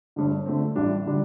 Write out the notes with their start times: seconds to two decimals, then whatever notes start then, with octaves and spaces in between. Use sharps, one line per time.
0.16 G1 G2 D3
0.46 D3 A3 C4
0.75 A1 A2 G3 D4
1.06 D3 G3 D4